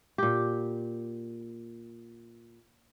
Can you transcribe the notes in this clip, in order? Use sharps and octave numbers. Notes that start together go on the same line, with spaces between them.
A#2 G4